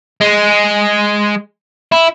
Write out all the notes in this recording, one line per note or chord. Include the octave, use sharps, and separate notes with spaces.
G#3
E4